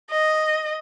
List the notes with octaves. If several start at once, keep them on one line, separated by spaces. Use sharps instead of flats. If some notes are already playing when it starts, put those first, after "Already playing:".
D#5